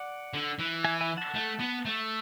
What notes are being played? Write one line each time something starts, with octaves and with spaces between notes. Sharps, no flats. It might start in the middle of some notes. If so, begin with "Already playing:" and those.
Already playing: D5 F#5
D3
E3
E5 G#5
E5 G#5
F#5 A5
A3
B3
A3